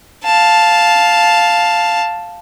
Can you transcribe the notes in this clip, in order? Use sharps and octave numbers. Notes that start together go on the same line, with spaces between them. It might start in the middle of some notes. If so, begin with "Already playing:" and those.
F5 A5